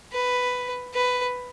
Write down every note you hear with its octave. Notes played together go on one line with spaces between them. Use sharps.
B4
B4